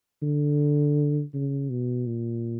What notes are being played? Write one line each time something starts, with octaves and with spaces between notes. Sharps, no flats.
D3
C#3
B2
A#2